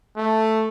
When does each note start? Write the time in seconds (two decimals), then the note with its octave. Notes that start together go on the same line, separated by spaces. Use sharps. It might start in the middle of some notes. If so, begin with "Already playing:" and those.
0.17 A3